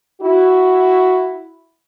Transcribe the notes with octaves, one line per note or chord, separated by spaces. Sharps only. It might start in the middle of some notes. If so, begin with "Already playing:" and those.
E4 F#4